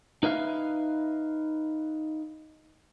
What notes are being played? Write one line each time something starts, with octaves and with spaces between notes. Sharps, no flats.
D#4 B4 E5 F5